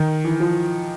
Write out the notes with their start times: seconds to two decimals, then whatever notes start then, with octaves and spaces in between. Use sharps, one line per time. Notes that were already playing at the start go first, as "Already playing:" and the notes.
Already playing: D#3
0.24 E3
0.40 F3